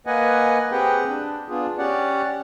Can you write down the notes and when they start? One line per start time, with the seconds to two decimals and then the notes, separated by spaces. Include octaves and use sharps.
0.07 A#3 B4 D#5 F#5 G#5
0.72 C4 G4 G#4 B4 F#5 G5
1.08 D4
1.49 B3 D4 F4 G#4
1.78 C#4 G4 D5 F#5